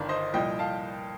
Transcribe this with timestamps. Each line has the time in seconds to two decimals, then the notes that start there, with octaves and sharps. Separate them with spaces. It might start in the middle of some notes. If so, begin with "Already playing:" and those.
Already playing: G1 G2 D#3 A#4 D5
0.09 C5 D#5
0.33 C2 A#2 F3 D#5 G5
0.59 F5 A5